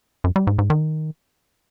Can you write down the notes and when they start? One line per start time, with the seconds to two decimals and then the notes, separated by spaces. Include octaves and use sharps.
0.24 F#2
0.36 G3
0.47 G#2
0.59 G#2
0.70 D#3